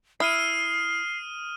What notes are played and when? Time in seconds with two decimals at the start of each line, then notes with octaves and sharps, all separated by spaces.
0.20 E4 D#6 F6 C7 D#7